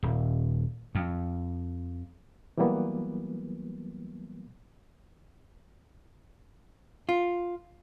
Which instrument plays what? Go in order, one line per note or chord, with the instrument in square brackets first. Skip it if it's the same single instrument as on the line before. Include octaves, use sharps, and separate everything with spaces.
[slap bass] D#1
F2
[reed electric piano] E3 F#3 G3 A#3 B3
[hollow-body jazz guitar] F4